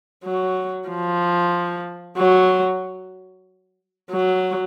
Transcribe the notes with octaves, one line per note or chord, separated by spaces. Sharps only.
F#3
F3
F#3
F#3